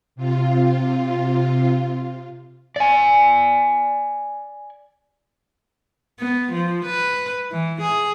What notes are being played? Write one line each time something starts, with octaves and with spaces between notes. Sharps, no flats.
C3 F4
D5 G#5
B3
F3
B4
E3
G#4